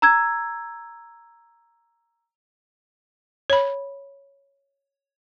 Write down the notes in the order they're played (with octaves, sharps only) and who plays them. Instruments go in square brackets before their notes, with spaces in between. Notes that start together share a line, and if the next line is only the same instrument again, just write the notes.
[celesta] A#5 E6 G#6
[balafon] C#5 B5